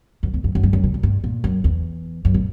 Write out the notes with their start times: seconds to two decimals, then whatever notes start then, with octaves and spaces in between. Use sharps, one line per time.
0.23 F#2
0.34 E2
0.44 F#2
0.55 F#2
0.63 G2
0.73 F#2
0.84 B2
0.94 A#2
1.03 G2
1.24 A#2
1.44 F#2
1.64 E2
2.25 F#2
2.34 A#2